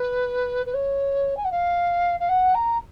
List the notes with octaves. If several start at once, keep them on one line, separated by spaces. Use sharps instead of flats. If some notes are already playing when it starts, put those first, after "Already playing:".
Already playing: B4
B4
C#5
G#5
F#5
F5
F5
F#5
A#5